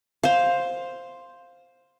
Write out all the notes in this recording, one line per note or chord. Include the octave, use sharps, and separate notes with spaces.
C5 F5